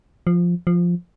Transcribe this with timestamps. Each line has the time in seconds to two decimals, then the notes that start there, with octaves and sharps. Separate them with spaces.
0.27 F3
0.67 F3